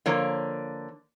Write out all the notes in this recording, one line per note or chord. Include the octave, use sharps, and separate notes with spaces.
D3 F3 A#3 C#5